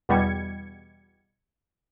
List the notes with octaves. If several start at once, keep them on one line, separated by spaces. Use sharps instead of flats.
E2 B2 G3 G#6 C#7